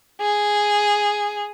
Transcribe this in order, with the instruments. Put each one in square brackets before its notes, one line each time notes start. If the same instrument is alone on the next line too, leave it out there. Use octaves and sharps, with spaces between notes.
[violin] G#4